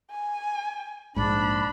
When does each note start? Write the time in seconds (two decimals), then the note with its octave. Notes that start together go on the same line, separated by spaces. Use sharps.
0.11 G#5
1.16 A#1 G#2 D4 B5